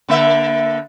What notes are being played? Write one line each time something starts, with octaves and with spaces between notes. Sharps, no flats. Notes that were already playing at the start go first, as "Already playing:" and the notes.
D3 A#3 E5